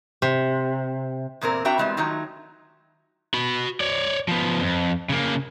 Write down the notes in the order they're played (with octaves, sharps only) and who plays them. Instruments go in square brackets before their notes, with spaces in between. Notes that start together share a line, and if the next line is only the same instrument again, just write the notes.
[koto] C3
[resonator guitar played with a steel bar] E2 A#2 C4 A#4
C4 D4 F#4 E5 G5 A#5
E3 G3 G#3 B3 C4
D#3 F#3 A3 D#4 F4
[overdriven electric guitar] F#4 B5
C#5 D5
F3 B3
F2
C#3 A#3